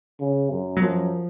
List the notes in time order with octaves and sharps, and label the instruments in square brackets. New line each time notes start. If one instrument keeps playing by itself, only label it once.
[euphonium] C#3
F#2
[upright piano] F#3
[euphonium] F#2 [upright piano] F3